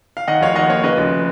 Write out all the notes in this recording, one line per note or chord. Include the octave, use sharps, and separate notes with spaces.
F5
D#3 D#5 F#5
F1 C#5 F5
D#2 D#5 F#5
A#3 C#5 F5
C#3 B4 D#5
F1